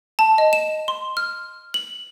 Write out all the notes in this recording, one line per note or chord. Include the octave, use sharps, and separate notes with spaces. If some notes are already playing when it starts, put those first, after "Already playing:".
A5
D#5
E7
C6
F6
F#7